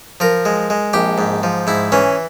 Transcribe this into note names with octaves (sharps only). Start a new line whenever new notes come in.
F3 A#4
G#3
G#3
A#1 G4
G#2
F3
G#2 E4
E3 C#4